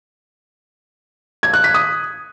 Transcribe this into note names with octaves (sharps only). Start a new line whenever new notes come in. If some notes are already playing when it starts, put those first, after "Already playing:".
G#6
F#6
B6
D#6